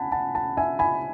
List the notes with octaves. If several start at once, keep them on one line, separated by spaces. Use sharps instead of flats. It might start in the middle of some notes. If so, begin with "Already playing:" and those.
Already playing: F#5 G#5 A5 B5
F#5 A5
F#5 A5
E5 G#5
G#5 B5